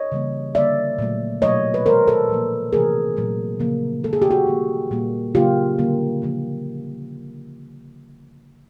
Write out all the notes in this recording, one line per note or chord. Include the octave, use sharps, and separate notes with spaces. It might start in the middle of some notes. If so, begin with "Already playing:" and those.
Already playing: C#5 D#5
C#3 E3 G3 A#3
D3 G3 A#3 D5 E5
A#2 F#3 A3
B2 F#3 A3 C#5 D#5
B4
D#3 G#3 A#4 C5
A4 B4
A#2 F3 A#3
C3 E3 A3 G#4 A#4
A#2 F#3 A3
C#3 F3 A#3
D#3 G#3 A4
G#4
G4
F#4 G#4
D#3 G3 A#3
A#2 G3 A#3
C#3 F#3 A#3 F4 G4
D3 G3 A#3
C#3 F3 A#3